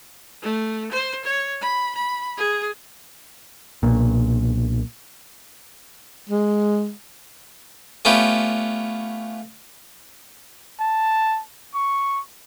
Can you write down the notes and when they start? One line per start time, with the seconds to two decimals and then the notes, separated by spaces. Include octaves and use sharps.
0.42 A3
0.91 C5
1.24 C#5
1.61 B5
1.95 B5
2.37 G#4
3.83 B1 A#2
6.30 G#3
8.05 A3 B3 C#4 F4 G4
10.80 A5
11.74 C#6